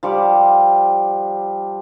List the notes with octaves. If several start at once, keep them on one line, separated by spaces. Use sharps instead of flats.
F3 G3 F#5 D6